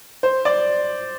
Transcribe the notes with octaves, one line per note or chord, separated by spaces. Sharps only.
C5
D5